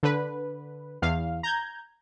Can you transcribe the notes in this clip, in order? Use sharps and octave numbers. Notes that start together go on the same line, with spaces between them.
D3 B4
E2 F5
A#5 G6 G#6